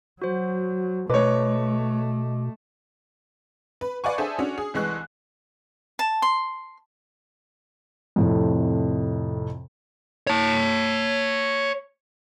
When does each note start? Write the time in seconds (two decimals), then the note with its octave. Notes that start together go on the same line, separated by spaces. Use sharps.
0.22 F#3 F#4 C5
1.10 B2 A3 B4 C#5 D#5 D6
3.81 B4
4.04 B4 D5 F5 F#5 G#5 C#6
4.18 D4 G#4 A4 C5 E5 G#5
4.39 C#4 D4 F#4
4.58 G#4
4.74 C2 E3 G#3 C#6 F#6
5.99 A5
6.22 C6
8.16 F2 A2 C3
10.27 C#5 A5